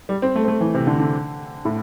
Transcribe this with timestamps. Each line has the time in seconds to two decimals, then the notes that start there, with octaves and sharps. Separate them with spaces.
0.09 G3
0.22 C4
0.35 A3
0.43 C4
0.48 A3
0.61 E3
0.74 C3
0.87 D3
1.00 D3
1.65 A2